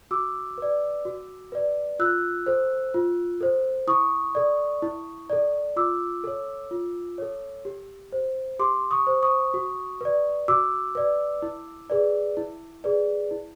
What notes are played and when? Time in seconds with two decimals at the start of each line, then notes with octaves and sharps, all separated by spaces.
0.11 F#4 D6 E6
0.58 B4 D5
1.05 F#4
1.52 B4 D5
1.99 F4 E6 F#6
2.46 A4 C5
2.94 F4
3.41 A4 C5
3.87 E4 C#6 D#6
4.35 A4 D5
4.82 E4
5.30 A4 D5
5.76 F4 D6 E6
6.24 A4 C#5
6.71 F4
7.18 A4 C#5
7.65 G4
8.12 C5
8.59 G4 C6 D6
8.91 C#6 D#6
9.07 C5
9.22 C#6 D#6
9.54 F#4
10.01 B4 D5
10.48 F#4 D6 E6
10.95 B4 D5
11.42 E4
11.90 G#4 B4 D5
12.37 E4
12.84 G#4 B4 D5
13.31 E4